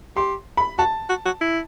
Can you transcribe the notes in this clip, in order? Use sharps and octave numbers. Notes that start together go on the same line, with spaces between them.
G4 C6
B5
F#4 A5
F#4
F#4
E4